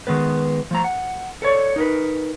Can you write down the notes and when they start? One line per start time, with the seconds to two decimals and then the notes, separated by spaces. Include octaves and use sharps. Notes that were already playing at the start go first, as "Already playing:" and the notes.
0.07 D#3 G#3 B3 B4
0.71 F3 A3 A#5
0.84 F#5
1.42 A4 B4 C#5 D5
1.76 D#4 A#4 B4